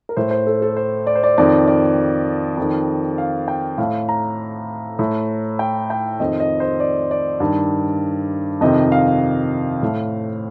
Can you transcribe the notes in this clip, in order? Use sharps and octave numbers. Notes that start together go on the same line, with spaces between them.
A#4
A2 C5
C5
A4
A4
C5
D5
C5
D5
F2 D#3 D5
D5
F2 D#3
F5
G5
A2 F5
A#5
A2
G5
G5
F2 D#3 D#5
D#5
C5
D5
D5
G2 D#3
F2 C3 D#3 D#5
F5
A2